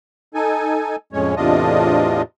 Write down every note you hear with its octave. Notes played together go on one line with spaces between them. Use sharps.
D#4 A4 G#5
F2 A2 G#3 C#4 C#5
E2 A2 C3 D4 F4 D#5